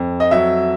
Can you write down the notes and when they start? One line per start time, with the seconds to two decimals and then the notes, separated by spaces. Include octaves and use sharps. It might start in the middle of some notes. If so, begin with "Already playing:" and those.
Already playing: F2
0.20 D#5
0.31 F#3 E5